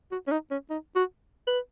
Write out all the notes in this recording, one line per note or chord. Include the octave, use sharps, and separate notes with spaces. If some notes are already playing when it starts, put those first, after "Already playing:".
F#4
C#4
D#4
C#4
D#4
F#4
B4